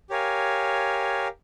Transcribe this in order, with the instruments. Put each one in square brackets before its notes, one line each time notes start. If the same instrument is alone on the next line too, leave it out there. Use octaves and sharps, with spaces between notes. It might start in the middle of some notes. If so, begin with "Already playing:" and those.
[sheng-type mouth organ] G4 A#4 C#5 F5 G#5